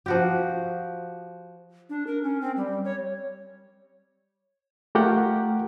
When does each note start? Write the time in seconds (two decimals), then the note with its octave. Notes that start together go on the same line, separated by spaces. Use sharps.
0.06 F3 F#4 G4
1.90 D4
2.07 A#4
2.23 C#4
2.41 C4
2.57 G3
2.85 C#5
4.95 A3 F4 G4 A#4 F#5 G5